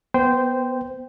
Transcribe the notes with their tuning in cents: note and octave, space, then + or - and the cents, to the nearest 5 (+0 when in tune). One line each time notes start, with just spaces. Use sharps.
B3 -5 C5 -15 G5 +0